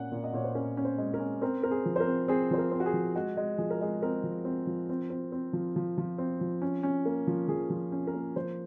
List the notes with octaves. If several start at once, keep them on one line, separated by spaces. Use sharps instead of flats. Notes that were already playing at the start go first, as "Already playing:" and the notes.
Already playing: A#2 C#4 F#5
A#2
D#5
A#2 C#5
C5
C#4 A#4
C#4
C5
G#3
A#4
C#4
C4 A#4
C4 A#4
G#4
F3
C5
A#4
C4
C4 G#4
F3 C5
A#4
C4
F#4
G#4
F3
G#3 F#4
G#3
F3 G#4
A#4
G#3 G#4
C4 A#4
F3
C4
F3
C4
C4
C4
F3
F3
F3
C4
F3
C#4
C#4
A#3
F3
F3 G#4
F3
C#4
A#4
A#3
F3 C5